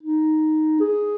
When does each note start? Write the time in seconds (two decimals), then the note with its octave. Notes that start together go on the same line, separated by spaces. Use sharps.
0.03 D#4
0.80 G#4